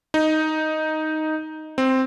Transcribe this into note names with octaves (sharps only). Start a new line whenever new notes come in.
D#4
C4